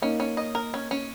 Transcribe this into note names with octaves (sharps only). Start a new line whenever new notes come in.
A#3 C#4 D#4
C#4
D#5
A#4
C#4
C#4